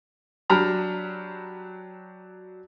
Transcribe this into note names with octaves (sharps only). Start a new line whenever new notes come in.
F#3 D4 G4 A#5 B5 F6